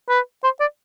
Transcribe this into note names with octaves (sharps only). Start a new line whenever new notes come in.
B4
C5
D5